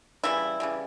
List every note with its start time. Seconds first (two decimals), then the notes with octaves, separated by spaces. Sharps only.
0.24 C#3 E3 G3 E4
0.60 C#3 E3 G3